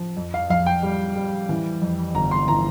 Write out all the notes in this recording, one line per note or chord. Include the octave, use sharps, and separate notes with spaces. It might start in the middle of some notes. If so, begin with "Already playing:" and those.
Already playing: F3
F2
F5
F2 F5
G5
G3
G3
E3
F2
G1 A#5
C6
E3 A#5